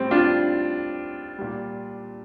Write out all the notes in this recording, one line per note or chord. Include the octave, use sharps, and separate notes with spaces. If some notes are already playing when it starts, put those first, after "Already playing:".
Already playing: A2 G3 C4
D4 F4
A#2 G3